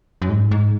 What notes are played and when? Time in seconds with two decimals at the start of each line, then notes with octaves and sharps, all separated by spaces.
0.22 F#2
0.29 G#2
0.51 G#2